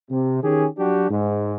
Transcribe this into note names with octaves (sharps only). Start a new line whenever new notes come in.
C3
D#3 C#4 G4 G#4
F#3 D4 F#4 G4
G#2